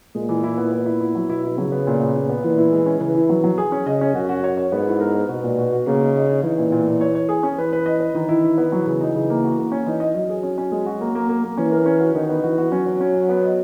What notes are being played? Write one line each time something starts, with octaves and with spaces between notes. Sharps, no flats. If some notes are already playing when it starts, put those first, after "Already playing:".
A#2 G#3
E3
E4
B3
B3
E4
E4
F#3
B2 E4
E4
C#3 F#3
B3
A#2
B3
A#2
B3
A#2 E3
E4
G#3
C#4
C#3 E3
E4
F#3
F#3
G#4
C#4
C#3 D#5
C#4
F#2 F#4
F#4
C#5
C#5
G#2 B3
E4
A#4
B3
B2 F#4
A#2
F#4
F#4
C#3 A#3
D#4
D#5
D#4
E3 D#4
A#2
A#2
A#2
C#5
C#5
G#4
C#4
E3 B4
B4
D#5
B4
D#3 E3
E4
D#3
B3
E3 F#3
C#3
D#4
C#3
A#3
F#4
A#3
C#4
E3 D#4
D#5
F#3 D#5
G#4
C#4
C#4
G#3
F#4
A#3
A#3
A#3
A#3
E3 C#4
A#4
C#4
F#4
D#3 D#4
B3
E3 F#4
F#4
F#3 C#4
C#4
C#4
C#5
B3
D#5